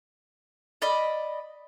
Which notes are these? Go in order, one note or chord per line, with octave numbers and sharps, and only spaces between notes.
D5 D#5 B5